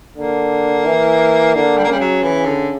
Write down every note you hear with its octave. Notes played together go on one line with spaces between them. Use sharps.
D3 A#3
E3
D3 A#3
G3
A#3
C#3 G3
F#3
E3
D3